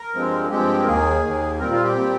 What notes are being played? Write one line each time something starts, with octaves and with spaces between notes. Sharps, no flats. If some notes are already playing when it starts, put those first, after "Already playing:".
Already playing: A#4
G2 F3 G#3 C4
G2 F3 G#3 C4 G4
A#4
D#2 D#3 A#3 G#4
D#2 D#3 A#3
A#2 G3 C4 A#4
F4
G4
A#2 G3 C4